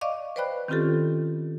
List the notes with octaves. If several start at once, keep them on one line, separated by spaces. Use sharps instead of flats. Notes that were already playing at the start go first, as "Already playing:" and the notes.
D5 D#5 F5 C#6 D6
B4 C5 D5 G5 B5 F#6
D#3 C4 C#4 F4 G4 A4